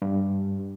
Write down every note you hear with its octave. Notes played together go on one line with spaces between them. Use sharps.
G2